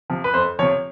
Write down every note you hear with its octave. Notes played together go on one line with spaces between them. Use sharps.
C3 F3
B4
F2 C5
C3 F3 C#5